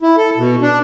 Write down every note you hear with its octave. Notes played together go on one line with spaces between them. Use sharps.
E4
A4
B2
D4